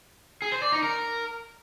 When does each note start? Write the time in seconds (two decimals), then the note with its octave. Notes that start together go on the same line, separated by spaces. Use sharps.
0.42 G#4
0.52 C5
0.62 D5
0.72 D#4
0.82 A#4